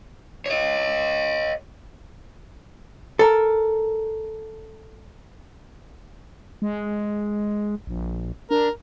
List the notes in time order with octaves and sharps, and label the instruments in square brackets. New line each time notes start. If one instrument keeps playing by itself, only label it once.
[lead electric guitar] C#5 D#5
[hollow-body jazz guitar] A4 A#4
[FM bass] G#3
A#1
[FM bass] D4 [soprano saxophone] A#4